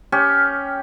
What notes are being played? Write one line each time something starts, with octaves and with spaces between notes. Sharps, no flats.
C#4 G4